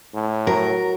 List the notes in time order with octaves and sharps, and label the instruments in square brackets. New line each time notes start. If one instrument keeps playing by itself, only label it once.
[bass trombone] A2
[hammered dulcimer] F#3 [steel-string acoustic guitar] A#4